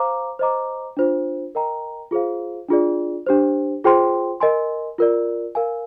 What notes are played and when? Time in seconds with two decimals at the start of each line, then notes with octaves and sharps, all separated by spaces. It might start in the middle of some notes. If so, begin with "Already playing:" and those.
Already playing: C5 F5 A#5 D6
0.39 C5 D#5 A#5 D6
0.97 D4 F4 C5
1.55 A#4 D#5 G5 A#5
2.11 F4 G#4 C5 F5
2.68 D4 F4 G#4 D5
3.26 D4 G4 C5
3.84 F4 G#4 C5 G5 C6
4.40 A#4 D#5 G#5 C6
4.98 F4 A#4 D5
5.55 A#4 F5 G#5